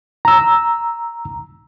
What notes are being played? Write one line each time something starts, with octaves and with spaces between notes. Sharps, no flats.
A#5 E6